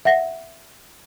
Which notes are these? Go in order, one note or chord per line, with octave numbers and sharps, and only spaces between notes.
E5 F#5 A#6